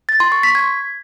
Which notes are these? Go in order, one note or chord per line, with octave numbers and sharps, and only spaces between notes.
A6
C6
C#6
B6
G#6